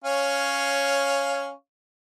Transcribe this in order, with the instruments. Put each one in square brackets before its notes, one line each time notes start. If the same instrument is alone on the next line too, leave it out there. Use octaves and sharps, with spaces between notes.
[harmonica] C#4 C#5 F5